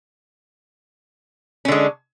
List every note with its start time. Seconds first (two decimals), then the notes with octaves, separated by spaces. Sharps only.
1.65 C#4
1.68 D3
1.72 G#3